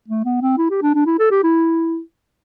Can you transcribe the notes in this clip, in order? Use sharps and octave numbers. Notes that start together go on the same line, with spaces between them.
A3
B3
C4
E4
G4
D4
D4
E4
A4
G4
E4